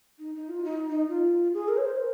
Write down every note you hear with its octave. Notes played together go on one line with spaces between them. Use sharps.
D#4
D#4
F4
D#4
D#4
F4
G#4
A#4
C#5
C5
A#4